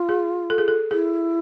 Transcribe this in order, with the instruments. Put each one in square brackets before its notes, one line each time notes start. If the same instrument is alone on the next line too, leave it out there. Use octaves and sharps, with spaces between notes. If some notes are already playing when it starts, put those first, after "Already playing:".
Already playing: [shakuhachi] F4
[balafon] G#4
A4
G#4
A4
[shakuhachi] E4 [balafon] G#4